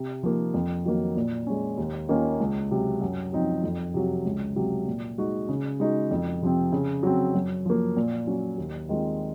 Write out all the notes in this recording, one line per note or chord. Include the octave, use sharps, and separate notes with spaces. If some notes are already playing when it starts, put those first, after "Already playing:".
Already playing: C3
F3 A#3 D#4
F2
D#3 F#3 A#3
A#2
G#3 C#4
D#2
D#3 A#3 C#4 F4
C#2
C3 F#3
F#2
F3 C4 D#4 F#4
F2
C3 F#3
C#2
C3 F#3
A#2
G#3 D#4 F#4
C#3
G#3 D#4 F#4
F2
C3 F3 C4
C#3
F#3 C4
F#2
F3 A#3
A#2
F#3 C#4
D#2
D#3 G#3 C4 F4